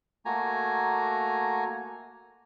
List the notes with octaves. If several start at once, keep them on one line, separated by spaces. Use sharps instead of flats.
A3 A#3 F#4 G#5 A#5